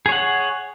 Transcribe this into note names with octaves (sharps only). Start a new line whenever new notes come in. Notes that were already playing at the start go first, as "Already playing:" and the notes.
G#4 C#5 F#5